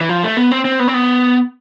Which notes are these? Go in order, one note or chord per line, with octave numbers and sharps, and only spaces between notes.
E3
F3
A3
B3
C4
C4
B3
C4
B3